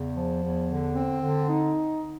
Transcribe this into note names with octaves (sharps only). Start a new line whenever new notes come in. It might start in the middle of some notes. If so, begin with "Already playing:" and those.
Already playing: E2 C#3
F3
E2
D3
C4
D3
D#4